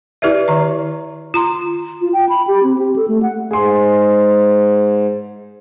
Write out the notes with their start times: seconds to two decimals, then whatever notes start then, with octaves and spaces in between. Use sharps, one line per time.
0.22 E4 G4 B4 D5 E5
0.48 D#3 A#5
1.34 F4 A#5 C6
2.01 F4
2.13 G5
2.29 B5
2.47 G4
2.63 C4
2.78 G4
2.96 A4
3.08 A3
3.22 F#5
3.51 G#2 G#4 C6